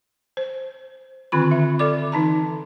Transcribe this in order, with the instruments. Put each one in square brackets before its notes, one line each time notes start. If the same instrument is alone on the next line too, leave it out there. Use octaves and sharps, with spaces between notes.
[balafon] C5
D3 D#3 C4 F4 B5
E5
A4 D5 D6
E3 D#4 A5 A#5